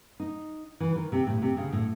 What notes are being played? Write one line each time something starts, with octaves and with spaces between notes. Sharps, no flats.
D#4
E3
D#3
C3
A2
C3
C#3
A2